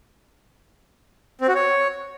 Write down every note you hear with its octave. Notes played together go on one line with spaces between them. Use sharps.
C4
F#4
C#5